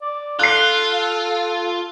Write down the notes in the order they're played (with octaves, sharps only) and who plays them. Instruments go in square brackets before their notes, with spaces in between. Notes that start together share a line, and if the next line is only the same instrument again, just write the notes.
[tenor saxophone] D5
[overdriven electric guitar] F4 [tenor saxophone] A4 [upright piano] F#6 C7